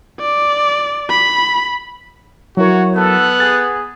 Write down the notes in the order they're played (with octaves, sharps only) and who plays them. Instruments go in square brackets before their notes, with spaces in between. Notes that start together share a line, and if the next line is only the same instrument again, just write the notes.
[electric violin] D5
B5
[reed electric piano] F#3 E4 A#4 [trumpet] F#4 [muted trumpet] C#5
[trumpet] B3 [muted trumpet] A4 [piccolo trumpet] F#6
[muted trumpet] G#4 [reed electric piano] A6